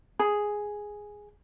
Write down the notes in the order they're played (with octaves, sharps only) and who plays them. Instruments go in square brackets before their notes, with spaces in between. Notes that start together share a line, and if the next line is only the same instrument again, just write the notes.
[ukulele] G#4